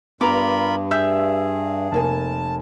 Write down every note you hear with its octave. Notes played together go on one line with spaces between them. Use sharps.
G2 B3 F4 A#4 A#5 B5 D6
G#4 E5 E6 G6
F1 A#3 G#5 A5